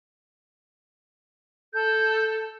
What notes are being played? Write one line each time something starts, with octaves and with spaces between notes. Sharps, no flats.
A4 G6